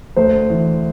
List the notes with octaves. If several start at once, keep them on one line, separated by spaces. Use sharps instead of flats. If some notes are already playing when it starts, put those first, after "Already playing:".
D2 C5
E3